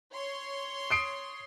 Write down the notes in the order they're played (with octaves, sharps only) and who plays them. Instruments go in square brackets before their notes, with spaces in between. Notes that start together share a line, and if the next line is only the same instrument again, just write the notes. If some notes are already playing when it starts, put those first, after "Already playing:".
[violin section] C#5 C6
[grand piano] D#6 C7 D7